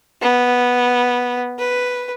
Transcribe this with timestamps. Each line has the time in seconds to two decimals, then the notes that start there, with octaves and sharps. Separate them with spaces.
0.22 B3
1.59 B4